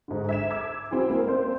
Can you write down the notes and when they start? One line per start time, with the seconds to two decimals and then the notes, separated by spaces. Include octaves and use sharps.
0.08 G#2 D3
0.29 E5 G#6 E7
0.51 D6 E6 G#6
0.91 C4 E4 F#4 G#4
1.10 A#3
1.27 A#3 C4 C5 D5